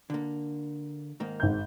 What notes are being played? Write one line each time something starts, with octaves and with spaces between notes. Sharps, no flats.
D3 A#3
G#2 D#3 A#3
G#1 G6